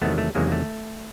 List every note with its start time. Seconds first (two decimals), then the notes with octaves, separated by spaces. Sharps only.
0.01 E2 C3 D#3 F#3 A3 B3
0.18 A3
0.35 E2 C3 D#3 F#3 G#3 A#3
0.47 A#3
0.52 A3